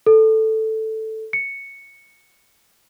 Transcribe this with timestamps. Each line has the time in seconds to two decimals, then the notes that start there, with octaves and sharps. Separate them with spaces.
0.06 A4
1.33 C#7